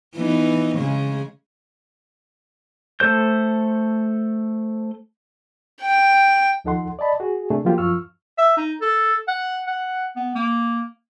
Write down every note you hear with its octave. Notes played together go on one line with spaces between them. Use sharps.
E3 B3 D#4
C#3 G#3 G#4
A3 A4 C5 G6
G5
D#2 F3 D#4 A4 F#5 C6
D5 D#5 A5 B5
F#4 G#4
C3 A3 D4 G#4
F3 F#3 A#3 F4 G4
F#2 F3 F4 C#6 E6 F6
E5
D#4
A4
F#5
F#5
B3
A#3